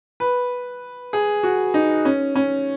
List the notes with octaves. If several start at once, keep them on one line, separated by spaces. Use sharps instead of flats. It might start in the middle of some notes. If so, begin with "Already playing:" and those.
B4
G#4
F#4
D#4
C#4
C#4